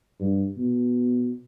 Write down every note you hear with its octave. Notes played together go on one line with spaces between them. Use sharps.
G2
B2